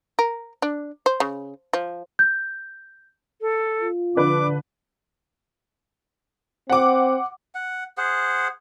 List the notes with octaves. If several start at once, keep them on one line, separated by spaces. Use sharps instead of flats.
A#4
D4
C5
C#3
F3
G6
A4
F4
D3 F3 D4 B4 D6
C4 F#5 D6
F#5
G#4 C5 F#5